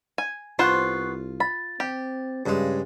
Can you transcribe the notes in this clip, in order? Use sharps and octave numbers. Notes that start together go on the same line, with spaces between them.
G#5
C2 B3 F4 C5 F#5 C#6 F#6 C7
B5 A6
C4 G4
G2 C#3 G#3